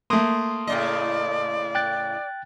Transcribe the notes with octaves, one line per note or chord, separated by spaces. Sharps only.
A3 A#3 C6 D#6
A2 C#3 D5 D#5
G5 F#6 A6